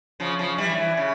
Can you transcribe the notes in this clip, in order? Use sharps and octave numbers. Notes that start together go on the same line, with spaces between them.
C#3 F3
C#3 F3
E3 G3
E3
C#3